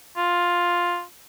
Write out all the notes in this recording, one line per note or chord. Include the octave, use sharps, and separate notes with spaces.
F4